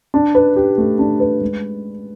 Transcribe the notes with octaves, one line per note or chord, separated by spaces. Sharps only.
D4
B4
G4
A3
D4
B4
G#3